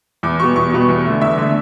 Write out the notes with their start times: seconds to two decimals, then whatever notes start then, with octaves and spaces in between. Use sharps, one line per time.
0.23 E2 D6
0.40 B2 G3 B3 C#6
0.56 E2 C#6
0.72 B2 G3 B3
0.89 E2
1.05 D3 A3
1.21 E2 E5
1.38 D3 A3